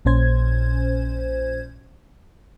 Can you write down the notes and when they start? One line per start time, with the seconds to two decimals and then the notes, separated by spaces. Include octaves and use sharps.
0.05 A#1 A#2 C#4 C5 G#6